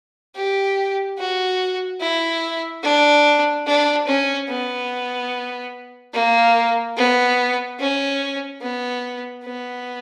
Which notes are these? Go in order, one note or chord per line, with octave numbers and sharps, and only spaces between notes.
G4
F#4
E4
D4
D4
C#4
B3
A#3
B3
C#4
B3
B3